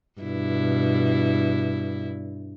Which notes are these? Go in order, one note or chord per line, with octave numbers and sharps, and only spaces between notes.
G2 B2 E4